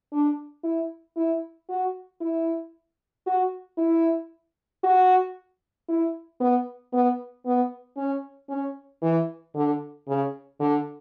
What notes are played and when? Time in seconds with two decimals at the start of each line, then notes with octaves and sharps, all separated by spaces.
0.12 D4
0.64 E4
1.16 E4
1.69 F#4
2.21 E4
3.26 F#4
3.78 E4
4.84 F#4
5.88 E4
6.40 B3
6.93 B3
7.46 B3
7.97 C#4
8.49 C#4
9.02 E3
9.55 D3
10.07 C#3
10.59 D3